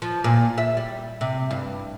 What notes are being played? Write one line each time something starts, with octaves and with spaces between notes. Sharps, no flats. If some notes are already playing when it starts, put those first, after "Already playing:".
F3
A#2
E5
G3
C3
G2